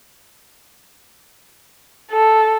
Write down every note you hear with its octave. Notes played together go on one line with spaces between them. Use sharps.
A4